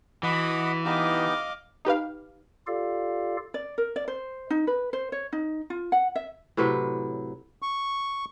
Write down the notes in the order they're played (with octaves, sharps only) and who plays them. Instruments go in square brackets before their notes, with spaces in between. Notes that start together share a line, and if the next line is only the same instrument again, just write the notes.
[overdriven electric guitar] E3 [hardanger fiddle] F#4 B5 [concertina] D#5 F#5 D6
[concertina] B3 D#4 G4 [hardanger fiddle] D#5 [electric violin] F5 D6
[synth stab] D#4 G4 B4 F5
[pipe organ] F4 G4 A4 D5 F5
[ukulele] D5
A#4
D5
C5
D#4
B4
C5
C#5
D#4
F4
F#5
E5
[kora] A2 C3 F#3 B4
[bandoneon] C#6